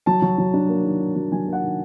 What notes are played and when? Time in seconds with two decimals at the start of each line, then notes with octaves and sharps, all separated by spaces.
0.06 F#3 A5
0.22 F#3
0.38 F#3
0.54 D4
0.69 A#3
0.85 D#3
1.01 D#3
1.16 F#3
1.32 F#3 G#5
1.47 A#3
1.53 F#5
1.63 D#3